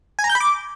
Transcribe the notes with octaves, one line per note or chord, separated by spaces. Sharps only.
G#5
A#5
G6
B5
D6